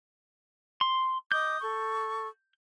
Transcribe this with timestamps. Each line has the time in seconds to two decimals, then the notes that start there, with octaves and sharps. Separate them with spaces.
0.81 C6
1.32 D#5 D6 D#6 G6
1.62 A4 C#6